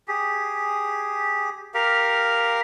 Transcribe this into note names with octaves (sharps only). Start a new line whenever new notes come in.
G4 G#4
G4 A#4 F5